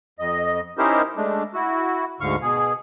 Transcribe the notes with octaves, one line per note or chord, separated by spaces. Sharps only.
F2 D#5
C#4 D#4 E4 G4 A#4 C5
G#3 A3 D4
E4 F#4
D2 G#2 D3 F5 C#6
B2 G#4